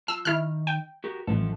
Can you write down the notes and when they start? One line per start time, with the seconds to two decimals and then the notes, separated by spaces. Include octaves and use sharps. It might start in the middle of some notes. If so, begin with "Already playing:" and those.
0.08 F4 A5 E6
0.25 D#3 E4 F6
0.67 G5
1.04 F#4 G4 A#4
1.27 A1 F#2 F3 A4